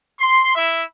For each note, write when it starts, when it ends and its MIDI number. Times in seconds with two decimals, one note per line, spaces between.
0.20 0.53 84
0.55 0.83 64
0.55 0.83 76